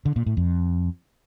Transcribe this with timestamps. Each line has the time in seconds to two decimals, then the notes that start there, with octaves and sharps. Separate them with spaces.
0.05 D3
0.16 A#2
0.26 A2
0.37 F2